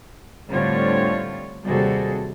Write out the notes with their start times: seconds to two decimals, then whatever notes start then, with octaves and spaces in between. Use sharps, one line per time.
0.50 A2 D3 G3 C4 F4 C#5
1.66 D#2 C3 G3 F#4 G#4 A4